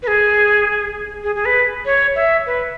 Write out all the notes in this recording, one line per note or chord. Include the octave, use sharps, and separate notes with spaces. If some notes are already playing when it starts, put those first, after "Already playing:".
B4
G#4
G#4
G#4
B4
C#5
E5
B4